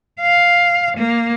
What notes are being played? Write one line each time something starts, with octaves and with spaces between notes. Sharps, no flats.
F5
A#3